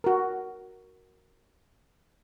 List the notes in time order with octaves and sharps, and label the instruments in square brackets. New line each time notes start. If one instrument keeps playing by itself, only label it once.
[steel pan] F#4 A#4